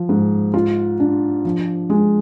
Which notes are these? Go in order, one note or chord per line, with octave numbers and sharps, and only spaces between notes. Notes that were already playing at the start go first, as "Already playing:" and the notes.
Already playing: F3
G#2
F4
D4
F3
G#3